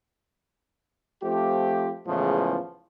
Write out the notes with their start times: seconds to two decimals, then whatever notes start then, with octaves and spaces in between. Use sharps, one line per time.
1.23 F3 A3 C4 F4 G4
2.07 E2 A2 C#3 E3 F3 G#3